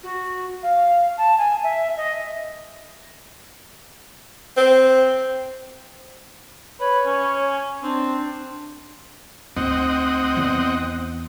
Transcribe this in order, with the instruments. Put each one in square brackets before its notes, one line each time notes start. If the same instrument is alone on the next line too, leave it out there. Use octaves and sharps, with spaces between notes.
[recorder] F#4
F5
A5
G#5
E5
D#5
[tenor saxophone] C4
[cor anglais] B4 [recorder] C#5
[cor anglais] C#4
[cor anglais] C4 [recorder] D4
[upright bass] D2 D#4 [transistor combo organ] C4 D#5 F#5
[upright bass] E2